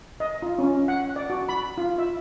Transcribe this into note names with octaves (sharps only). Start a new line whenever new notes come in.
D#5
F4
C#4
F#5
D5
F#4
B5
F4
E5